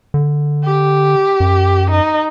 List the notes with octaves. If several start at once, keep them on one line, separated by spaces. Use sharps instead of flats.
D3
G4
F#2
D#4